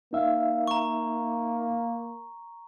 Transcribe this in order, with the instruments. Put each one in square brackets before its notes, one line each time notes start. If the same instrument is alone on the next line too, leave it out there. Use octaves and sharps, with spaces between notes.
[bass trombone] A#3 [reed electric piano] D#4 E5 F5
[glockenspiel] A#5 C#6